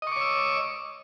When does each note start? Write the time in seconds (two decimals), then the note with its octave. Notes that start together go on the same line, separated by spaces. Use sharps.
0.02 D#5
0.07 C#6
0.12 D6
0.16 C#5
0.21 E6